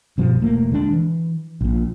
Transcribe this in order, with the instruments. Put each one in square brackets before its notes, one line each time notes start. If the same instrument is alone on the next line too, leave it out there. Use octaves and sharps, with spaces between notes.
[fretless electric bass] G1 B2 F3 G3
E1 A3 A#3
D3 G#3 D4
E3
A#1 A#2